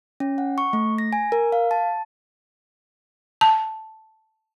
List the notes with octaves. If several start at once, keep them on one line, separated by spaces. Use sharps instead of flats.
C#4
F#5
C#6
A3
A#6
G#5
A#4
F5
A5
A5